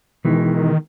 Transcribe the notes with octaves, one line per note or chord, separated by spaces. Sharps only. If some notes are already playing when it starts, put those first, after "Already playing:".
B2 D#3 E3 G#3